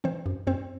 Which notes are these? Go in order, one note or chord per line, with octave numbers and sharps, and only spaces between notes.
E3 C4 C5
F#2
F#2 C4 C5